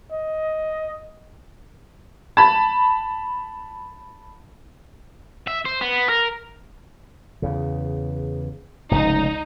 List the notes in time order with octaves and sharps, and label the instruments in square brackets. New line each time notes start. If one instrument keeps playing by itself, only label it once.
[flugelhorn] D#5
[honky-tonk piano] A5 B5
[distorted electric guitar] E5
C5
B3
A#4
[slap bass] E2 C#3
[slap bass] F1 C#2 G#2 [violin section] D#4